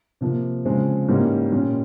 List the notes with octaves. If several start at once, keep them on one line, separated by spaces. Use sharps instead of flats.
C3 F3 A#3
C#3 F3 G#3 C4
G#2 E3 G3 A#3 C#4
A#2 G3 C#4